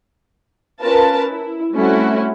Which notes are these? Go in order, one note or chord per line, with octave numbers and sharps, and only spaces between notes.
C#4 F4 A#4 B4 A5
E4
G3 A3 C4 C#4 E4 F#4